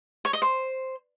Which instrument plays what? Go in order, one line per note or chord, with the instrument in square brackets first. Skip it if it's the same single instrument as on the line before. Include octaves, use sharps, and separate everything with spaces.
[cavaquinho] C#5
D#5
C5